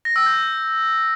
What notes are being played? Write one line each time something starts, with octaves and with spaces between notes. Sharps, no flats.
A#6
E6
G6